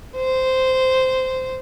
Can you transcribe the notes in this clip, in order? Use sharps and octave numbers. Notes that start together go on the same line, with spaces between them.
C5